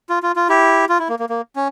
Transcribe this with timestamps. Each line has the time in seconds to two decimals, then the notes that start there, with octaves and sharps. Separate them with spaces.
0.09 F4
0.23 F4
0.36 F4
0.49 E4 G4
0.89 F4
0.99 E4
1.09 A#3
1.19 A#3
1.29 A#3
1.56 C#4